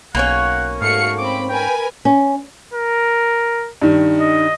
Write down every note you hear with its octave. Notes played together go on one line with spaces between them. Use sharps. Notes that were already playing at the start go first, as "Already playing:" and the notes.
B1 A#3 C#4 C#5 F#5
G#2 A3 F#4 F5 C#7
C4 B5 D6
A#4 B4 G5 G#5
C#4
A#4
G2 D#3
D#5